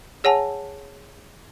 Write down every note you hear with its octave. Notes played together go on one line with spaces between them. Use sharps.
G#4 C#5 F#5 G#5 A5